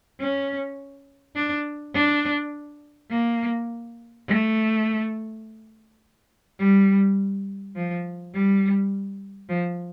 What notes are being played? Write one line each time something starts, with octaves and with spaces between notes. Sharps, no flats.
C#4
D4
D4
A#3
A3
G3
F3
G3
F3